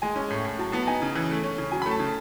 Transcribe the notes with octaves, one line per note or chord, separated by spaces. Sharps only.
G#3 G#5
C#4
A2
A2
F#3 A5
B3 A5
D#4 G#5
C#3
E3
A3
C#4
C#3
F#3 G#5
B5
A3
A5
C#3